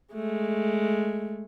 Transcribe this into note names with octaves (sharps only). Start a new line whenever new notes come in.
G#3 A3